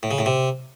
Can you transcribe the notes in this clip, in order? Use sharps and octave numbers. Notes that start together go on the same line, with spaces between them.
A2
C#3
A2
C3